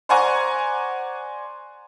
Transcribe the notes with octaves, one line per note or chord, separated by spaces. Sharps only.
C5 D5 F#5 G#5 A#5 C#6